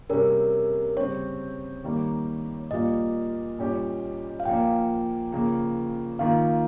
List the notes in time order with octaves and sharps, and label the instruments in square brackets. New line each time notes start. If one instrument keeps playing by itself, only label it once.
[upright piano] C3 G3 C#4 G#4 [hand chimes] A#4
[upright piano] C#3 G3 C4 [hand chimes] C#5
[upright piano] D#3 G3 A#3
[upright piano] A#2 G3 A#3 F4 [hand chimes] D#5
[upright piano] A#2 G3 C#4 G4
[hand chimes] F5
[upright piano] A#2 F3 A#3 [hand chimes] G5
[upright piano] C#3 F3 A#3
[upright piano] D#3 A#3 F4 [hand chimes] F5